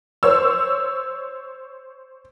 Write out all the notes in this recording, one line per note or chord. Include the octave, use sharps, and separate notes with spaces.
C5 C#5 E6